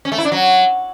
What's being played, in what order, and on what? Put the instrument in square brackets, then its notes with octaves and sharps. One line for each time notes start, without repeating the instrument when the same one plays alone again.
[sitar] C#4
A3
E4
D4
F#3